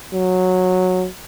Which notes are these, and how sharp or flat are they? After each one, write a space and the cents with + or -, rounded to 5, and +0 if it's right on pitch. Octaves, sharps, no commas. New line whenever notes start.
F#3 -10